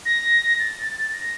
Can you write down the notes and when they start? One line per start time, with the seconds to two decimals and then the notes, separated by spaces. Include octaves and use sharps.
0.05 A#6
0.59 A6
1.13 A#6